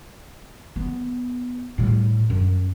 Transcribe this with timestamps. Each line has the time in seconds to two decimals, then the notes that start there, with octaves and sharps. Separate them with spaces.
0.76 B3
1.78 A2 G3
2.30 F#2